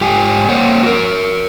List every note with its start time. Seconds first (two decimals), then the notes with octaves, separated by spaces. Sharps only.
0.01 G#2 G4 G5 G#5
0.49 A#3 C5 C#5 F#5 G5
0.83 F#4 A#4